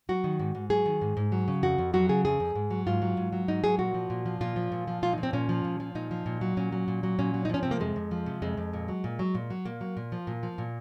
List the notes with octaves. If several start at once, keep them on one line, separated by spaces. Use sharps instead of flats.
F#3 F#4
D#3
G#2
G#2
F#3 G#4
D#3
G#2
G#2
F#3
C#3
F2 F#4
F2
F#3 F#4
C#3 G#4
F2 G#4
F2
G#2
F#3
G#2 F4
F#3
G#2
F#3
G#2 D#4
F#3 G#4
A#2 F#4
F3
A#2
F3
A#2 F4
F3
A#2
F3
A#2 F4
D#4
F3
C4
A#2 C#4
F3
A#2
F3
A#2 D#4
F3
A#2
F#3
A#2 C#4
F#3
A#2
F#3
A#2 C#4
F#3
D#4
F3 C#4
C3 C4
A#3
F2 G#3
F2
F3
C3
F2 G#3
F2
A#2
F#3
A#2
F#3
A#2
F#3
A#2 A#3
F#3
A#2
F3
A#2
F3
A#2